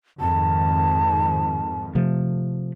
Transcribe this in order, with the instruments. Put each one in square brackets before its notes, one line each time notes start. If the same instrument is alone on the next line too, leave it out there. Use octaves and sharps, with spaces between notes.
[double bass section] F2 G#2 D#3 [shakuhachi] A5
[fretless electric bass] C3 F3 A3